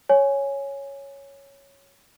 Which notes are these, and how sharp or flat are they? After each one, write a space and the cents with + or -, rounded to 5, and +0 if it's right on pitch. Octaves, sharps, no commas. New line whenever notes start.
C#5 +0 G#5 +0